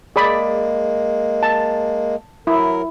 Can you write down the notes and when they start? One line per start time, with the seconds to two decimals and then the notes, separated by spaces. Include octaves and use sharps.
0.16 G#3 A#3 G#4 D5 B5
1.43 A5
2.47 F#3 E4 A#4